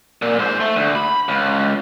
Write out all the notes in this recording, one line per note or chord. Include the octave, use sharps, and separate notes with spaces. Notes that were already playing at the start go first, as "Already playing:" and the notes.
A#2
G#2 C5
A3
D2
B5
C#2